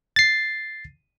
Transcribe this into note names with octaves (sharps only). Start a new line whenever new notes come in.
A6 C7